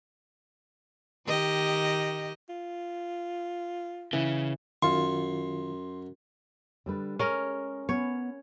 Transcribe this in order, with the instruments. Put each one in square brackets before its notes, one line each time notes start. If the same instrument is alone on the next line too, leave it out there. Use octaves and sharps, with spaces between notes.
[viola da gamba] D#3 G4 D#5
[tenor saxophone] F4
[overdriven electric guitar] C#3 [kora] E3
[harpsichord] F#2 C#6 [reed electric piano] D#3 F4 [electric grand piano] C6
[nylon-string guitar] D3 G3 B4
[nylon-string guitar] G#3 [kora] C#4 A#4
[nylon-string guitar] B3 C#4 [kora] C#5